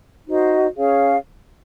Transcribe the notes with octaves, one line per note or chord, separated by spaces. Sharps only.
D#4 F#4 C5 D#5
C#4 G#4 C#5 F5